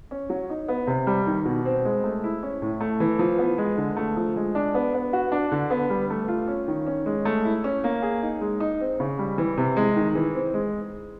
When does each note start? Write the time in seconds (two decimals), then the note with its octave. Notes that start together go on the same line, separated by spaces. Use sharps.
0.11 C#4
0.30 F#3
0.50 D#4
0.68 B3
0.87 C3
1.07 G3
1.27 D#3
1.45 B2
1.65 C4
1.85 G#3
2.04 A3
2.24 E4
2.43 C#4
2.62 A2
2.80 A3
3.00 E3
3.19 F3
3.39 B3
3.58 G#3
3.77 D3
3.97 A3
4.17 F3
4.36 G#3
4.55 D4
4.75 B3
4.94 B3
5.13 F#4
5.32 D4
5.52 D3
5.70 B3
5.90 G3
6.10 A3
6.28 F4
6.48 C#4
6.68 D#3
6.87 C#4
7.06 G#3
7.25 A3
7.45 E4
7.64 C#4
7.84 A#3
8.02 G#4
8.22 D#4
8.41 G#3
8.60 D#4
8.81 C4
9.00 C#3
9.19 G3
9.38 E3
9.57 C3
9.77 G#3
9.96 D#3
10.15 E3
10.34 C4
10.54 G#3